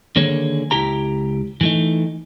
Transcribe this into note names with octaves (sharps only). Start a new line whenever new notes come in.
D3 D#3 A#3 G#4 C#5
C#2 E4 G4 A#5
E3 A3 D#4